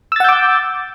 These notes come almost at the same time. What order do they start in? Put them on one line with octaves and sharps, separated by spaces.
E6 A6 F#5 G6 D6